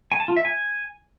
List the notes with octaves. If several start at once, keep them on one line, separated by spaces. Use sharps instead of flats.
G#5
A5
F4
E5
G#5